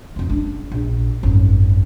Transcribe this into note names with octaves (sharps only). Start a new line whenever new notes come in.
F2 D#3
F#1 D4
A#1
G#1 F#2